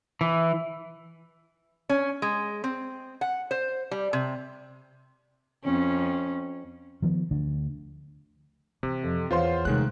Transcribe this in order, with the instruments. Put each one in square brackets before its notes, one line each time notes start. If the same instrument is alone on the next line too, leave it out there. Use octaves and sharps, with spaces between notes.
[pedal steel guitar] E3
[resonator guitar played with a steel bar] C#4
G#3
C4
F#5
C5
G3
C3
[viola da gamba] F2 C#4
[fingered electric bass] D#3 F3 B3
D2 D3 A3 D4
[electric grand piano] C3 [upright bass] E3
[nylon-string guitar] F2
[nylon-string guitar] E2 C#5 F5 [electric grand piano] F4 C5 C6
[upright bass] C3 A3 [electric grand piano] D#3 G#3 F#6